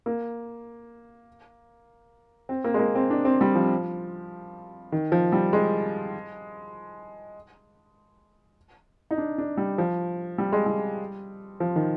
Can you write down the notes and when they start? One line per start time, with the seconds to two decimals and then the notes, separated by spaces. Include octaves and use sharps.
0.06 A#3
2.49 C4
2.64 A#3
2.74 G#3
2.79 A#3
2.95 C4
3.10 D4
3.25 C4
3.41 G3
3.55 F3
4.92 D#3
5.12 F3
5.32 G3
5.53 G#3
9.11 D#4
9.18 D4
9.38 D4
9.57 G3
9.78 F3
10.38 G3
10.52 G#3
10.66 G3
11.60 F3
11.76 D#3